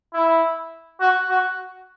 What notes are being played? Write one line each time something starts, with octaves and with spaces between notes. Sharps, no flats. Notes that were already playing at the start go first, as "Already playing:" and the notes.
E4
F#4
F#4